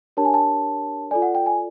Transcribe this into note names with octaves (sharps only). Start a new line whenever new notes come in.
D4 G4 A#4 C#5 A5
G#5
A5
F4 A4 D5 G#5
F#5
G5
G#5